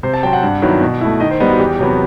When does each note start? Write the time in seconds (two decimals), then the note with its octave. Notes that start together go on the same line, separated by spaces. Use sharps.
0.03 C3 C5
0.14 A5
0.23 F#3 C4 G5
0.33 F#5
0.43 G2
0.62 D#3 F#3 B3 E4
0.81 B2
1.01 A3 E4
1.20 D#3 D#5
1.31 C5
1.40 G3 B3 D#5
1.50 F#4
1.59 E2 G4
1.79 C3 F#3 B3